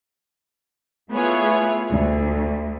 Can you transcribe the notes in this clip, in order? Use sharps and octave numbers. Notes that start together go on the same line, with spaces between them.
A3 B3 E4 F4 G#4 C#5
D2